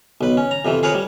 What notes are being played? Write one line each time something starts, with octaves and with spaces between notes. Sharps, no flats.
B1 B4
C#4
A#5
F2 C3 E3
G#4 A#4 B4 C#5
G3